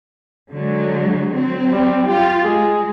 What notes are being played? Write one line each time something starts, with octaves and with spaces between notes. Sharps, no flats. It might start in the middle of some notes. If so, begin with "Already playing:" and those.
D3 F#3 G#3
F#3 C4
G3
F4 G4
G#3 G#4